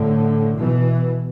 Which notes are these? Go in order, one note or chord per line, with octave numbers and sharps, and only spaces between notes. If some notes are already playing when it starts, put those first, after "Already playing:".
Already playing: A2 D3
B2 E3